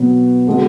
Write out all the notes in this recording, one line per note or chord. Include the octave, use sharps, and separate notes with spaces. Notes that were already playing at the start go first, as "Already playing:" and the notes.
Already playing: B2 F#3 B3
D3 G#3 B3 F#4 A4